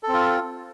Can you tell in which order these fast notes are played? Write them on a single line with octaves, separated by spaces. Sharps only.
A4 C4 F4